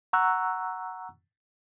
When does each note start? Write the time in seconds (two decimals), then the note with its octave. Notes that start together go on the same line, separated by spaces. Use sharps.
0.13 F#5 A#5 C#6 E6 F#6